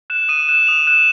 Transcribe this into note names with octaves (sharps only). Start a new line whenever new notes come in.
F#6 E7
D#6 D#7
F#6 E7
D#6 F7
F#6 E7